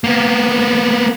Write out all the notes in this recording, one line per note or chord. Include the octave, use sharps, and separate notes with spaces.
A#3 B3